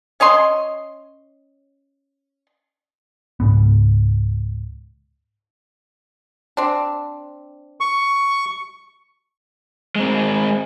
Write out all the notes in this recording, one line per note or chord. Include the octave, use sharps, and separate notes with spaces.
C#4 C#5 D#5 C6
C#2 G#2 B3
C4 D4
C#6
G#3 C4